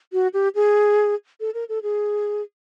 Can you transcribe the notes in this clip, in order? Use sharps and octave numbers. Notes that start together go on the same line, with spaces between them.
F#4
G4
G#4
A4
A#4
A4
G#4